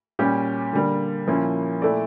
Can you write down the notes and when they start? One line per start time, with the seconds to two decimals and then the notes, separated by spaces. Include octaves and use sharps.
0.19 A#2 G3 C#4 G4
0.73 D3 G3 A#3
1.28 A#2 F3 A#3 C#4 E4
1.82 A#2 A3 E4 A4 D5